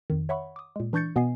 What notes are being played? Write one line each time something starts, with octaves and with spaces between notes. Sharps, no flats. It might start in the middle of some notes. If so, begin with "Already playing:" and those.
F2 D#3
C#5 E5 F#5 B5 C#6
D6 D#6
A#2 G#3
E3 D4 C#6 G6 A6 C#7
B2 B3 D#5 G#5 C7